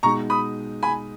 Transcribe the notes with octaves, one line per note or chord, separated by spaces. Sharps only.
B2 G#3 D#4 A#5 C#6
B5 D#6
G#5 B5